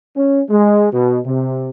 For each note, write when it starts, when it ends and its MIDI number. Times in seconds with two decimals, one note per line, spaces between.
0.15 0.41 61
0.49 0.87 56
0.91 1.18 47
1.25 1.69 48